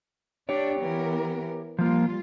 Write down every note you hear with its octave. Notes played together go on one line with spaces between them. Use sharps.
D4 G4 C#5 D5
E3 B3 A#4
F3 G3 A#3 F4